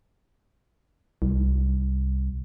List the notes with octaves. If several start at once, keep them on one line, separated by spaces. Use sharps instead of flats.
C2